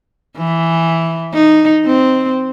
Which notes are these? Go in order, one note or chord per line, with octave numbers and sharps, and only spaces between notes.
E3
D#4
C4